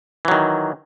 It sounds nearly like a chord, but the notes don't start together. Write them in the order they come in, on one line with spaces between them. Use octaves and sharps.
E3 F#3 D#3